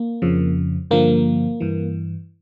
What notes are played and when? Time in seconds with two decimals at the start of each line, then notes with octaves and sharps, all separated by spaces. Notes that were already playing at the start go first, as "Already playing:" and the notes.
Already playing: A#3
0.22 F2 C#3 F3
0.91 G2 D3 F3 A#3
1.60 G2 E3